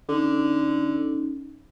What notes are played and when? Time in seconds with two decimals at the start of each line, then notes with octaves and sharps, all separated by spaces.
0.09 D3 C#4 D#4